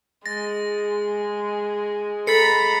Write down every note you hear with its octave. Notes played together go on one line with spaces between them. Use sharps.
G#3 A6 A#6
A4 A#5 B5 A6 C7 C#7